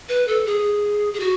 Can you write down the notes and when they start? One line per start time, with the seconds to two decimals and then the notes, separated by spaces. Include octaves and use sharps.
0.09 B4
0.28 A4
0.46 G#4
1.14 G#4
1.20 F#4